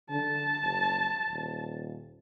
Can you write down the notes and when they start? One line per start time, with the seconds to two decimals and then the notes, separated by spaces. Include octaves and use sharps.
0.11 D3 A5
0.63 F#1
1.30 D#1